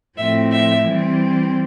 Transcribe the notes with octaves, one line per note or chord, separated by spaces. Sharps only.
A2 F3 C4 E5
E5
E3 G3 C4